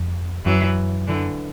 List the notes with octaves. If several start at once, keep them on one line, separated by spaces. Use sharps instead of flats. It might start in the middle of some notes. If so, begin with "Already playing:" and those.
Already playing: F2
F#2 E3 F#3
D3 E3